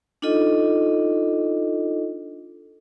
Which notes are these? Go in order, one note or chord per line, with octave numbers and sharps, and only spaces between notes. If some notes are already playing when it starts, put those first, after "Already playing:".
D4 D#4 F4 A4 D#5